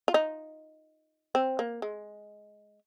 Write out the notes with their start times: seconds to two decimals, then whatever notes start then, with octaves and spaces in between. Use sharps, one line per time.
0.08 F4
0.14 D#4
1.35 C4
1.59 A#3
1.82 G#3